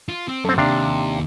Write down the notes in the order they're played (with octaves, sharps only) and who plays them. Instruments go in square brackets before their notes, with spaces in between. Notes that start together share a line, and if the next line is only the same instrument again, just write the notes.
[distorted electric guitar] F4
C4
[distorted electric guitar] F#2 [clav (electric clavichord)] C4 A4
[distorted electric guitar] D#2 [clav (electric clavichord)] C3 D4 F5